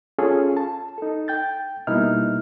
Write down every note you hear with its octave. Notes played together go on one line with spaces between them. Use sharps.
C#4 F4 G#4 A4
A5
D#4 A4
G5 G6 A6
B2 G3 A#3 D#4 E4 F6